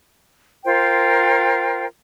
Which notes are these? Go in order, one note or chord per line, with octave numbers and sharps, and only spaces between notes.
F4 A#4 C5 G5